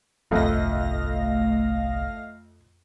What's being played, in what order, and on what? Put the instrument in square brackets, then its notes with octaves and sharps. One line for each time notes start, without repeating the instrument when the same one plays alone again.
[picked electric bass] G1 C2 [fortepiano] F2 [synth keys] A3 D#5 A#6 [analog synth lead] F5